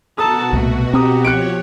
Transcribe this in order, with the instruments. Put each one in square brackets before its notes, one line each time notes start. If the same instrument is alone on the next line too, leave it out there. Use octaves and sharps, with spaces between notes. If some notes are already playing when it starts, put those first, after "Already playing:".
[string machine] B2 F#4 [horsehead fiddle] A4 A5 [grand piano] A#5 D#6
[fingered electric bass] C2 A#2 [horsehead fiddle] A3
[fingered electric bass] C4 [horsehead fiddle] G4 [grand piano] A#5 D#6
[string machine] F3 C#5 [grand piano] F#6 C#7 D7